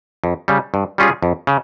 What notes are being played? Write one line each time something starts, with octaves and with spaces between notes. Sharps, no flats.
F2
C#3 G3
G2
G3 C#4 F4 G#4
F2
C#3